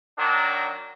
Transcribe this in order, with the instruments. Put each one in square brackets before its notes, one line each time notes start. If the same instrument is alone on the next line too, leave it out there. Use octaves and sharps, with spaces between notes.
[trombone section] D#3 F#3 D4